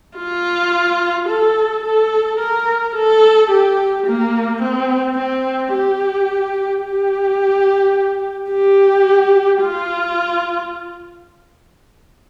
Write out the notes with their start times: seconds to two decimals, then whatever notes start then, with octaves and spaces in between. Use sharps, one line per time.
0.17 F4
1.28 A4
1.84 A4
2.39 A#4
2.95 A4
3.50 G4
4.06 A#3
4.62 C4
5.18 C4
5.73 G4
6.83 G4
8.51 G4
9.62 F4